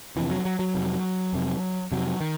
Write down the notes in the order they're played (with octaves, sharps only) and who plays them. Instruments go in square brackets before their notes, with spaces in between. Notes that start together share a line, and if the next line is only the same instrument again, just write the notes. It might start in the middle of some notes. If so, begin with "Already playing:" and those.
[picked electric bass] F2 C3 E3
F#3
F#3
F#3
F2 C3
F2 C3
F2 C3 F#3
D#3